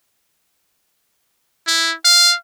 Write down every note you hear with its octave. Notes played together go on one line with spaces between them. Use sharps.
E4
F5